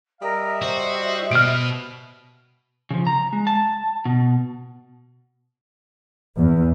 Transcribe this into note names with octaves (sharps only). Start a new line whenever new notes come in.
G3 A#4 D#5 E5
F#4 C5
B2 F6 D7
C#3 F3
A#5
G#3
A5
B2
E2